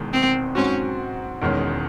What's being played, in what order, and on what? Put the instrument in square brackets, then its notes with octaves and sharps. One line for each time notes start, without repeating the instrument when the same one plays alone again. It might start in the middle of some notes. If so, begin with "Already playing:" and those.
Already playing: [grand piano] E1 E2 D#3 G#3
[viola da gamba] C4
[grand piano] G#2 F#3 C4 F#4 [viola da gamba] C#4
[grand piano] E1 E2 D#3 G#3 C#4